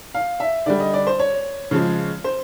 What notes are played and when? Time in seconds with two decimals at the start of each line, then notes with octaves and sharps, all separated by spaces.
0.14 F5
0.40 E5
0.66 D3 G3 D5
0.80 D#5
0.94 D5
1.07 C5
1.19 C#5
1.71 C#3 F3 G#3
2.24 C5